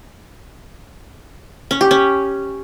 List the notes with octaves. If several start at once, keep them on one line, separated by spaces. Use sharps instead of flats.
C#4
G4
C#4